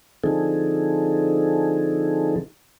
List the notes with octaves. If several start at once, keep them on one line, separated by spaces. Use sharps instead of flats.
D3 F3 C4 D#4 G#4 A4